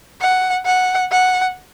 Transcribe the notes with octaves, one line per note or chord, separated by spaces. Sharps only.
F#5
F#5
F#5